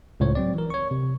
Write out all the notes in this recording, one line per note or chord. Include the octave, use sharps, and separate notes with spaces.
C#2 A2 C5 C#5
F#3 C4 D5
E3 A#4
C#5 C#6
C3